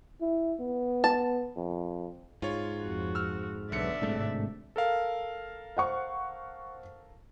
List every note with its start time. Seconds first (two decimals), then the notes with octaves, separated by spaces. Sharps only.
0.21 E4
0.60 B3
1.04 A5
1.56 F2
2.42 G#2 F4 C#5
2.83 F2 F#4
3.15 E6 F6
3.72 B1 D3 F#3 B3 D5 E5 C#7
4.02 G#1 A2 C3 G#3 A3 D4
4.76 A4 A#4 F5
5.77 C5 F#5 C#6